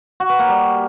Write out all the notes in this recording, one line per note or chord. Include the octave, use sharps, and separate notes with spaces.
F#4
B4
A#3
G3